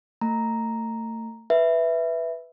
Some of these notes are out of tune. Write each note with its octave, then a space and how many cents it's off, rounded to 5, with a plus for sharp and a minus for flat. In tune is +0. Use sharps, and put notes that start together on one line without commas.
A3 +35 A#5 +0
B4 +0 E5 +0